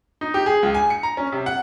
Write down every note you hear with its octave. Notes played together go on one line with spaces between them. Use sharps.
D#4
G4
G#4
C#2
G#5
C#7
A#5
C#4
C3
F#5